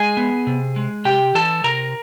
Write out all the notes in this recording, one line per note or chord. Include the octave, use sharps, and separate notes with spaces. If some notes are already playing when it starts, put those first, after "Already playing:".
Already playing: G#3 G#4 G#5
B3
C3
G#3
C3 G4 G5
E3 A4 A5
C3 A#4 A#5